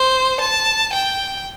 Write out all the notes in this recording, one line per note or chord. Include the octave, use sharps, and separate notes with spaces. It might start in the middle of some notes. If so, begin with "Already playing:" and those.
Already playing: C5
A5
G5